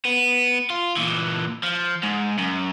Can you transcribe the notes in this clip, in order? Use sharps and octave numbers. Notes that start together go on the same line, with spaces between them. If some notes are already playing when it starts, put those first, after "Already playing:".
B3
F4
A#2 E3
F3
G#2
F#2